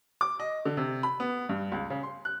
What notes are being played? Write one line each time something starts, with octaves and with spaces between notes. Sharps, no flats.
D6
D#5
D3
C3
B5
B3
G2
C#2
C#3
C6
F#6